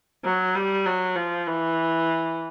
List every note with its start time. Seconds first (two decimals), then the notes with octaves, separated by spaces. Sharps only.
0.24 F#3
0.55 G3
0.86 F#3
1.16 F3
1.47 E3